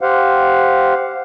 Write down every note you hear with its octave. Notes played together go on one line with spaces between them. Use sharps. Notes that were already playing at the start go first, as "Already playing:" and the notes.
G4 C5 F5 F#5